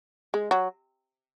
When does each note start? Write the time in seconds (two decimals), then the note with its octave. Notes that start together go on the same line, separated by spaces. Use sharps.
0.34 G#3
0.51 F#3